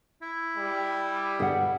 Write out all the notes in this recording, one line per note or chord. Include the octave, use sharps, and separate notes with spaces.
E4
G3
G2 B2 D3 G#4 F#5